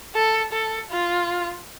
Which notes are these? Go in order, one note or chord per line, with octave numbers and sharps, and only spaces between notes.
A4
A4
F4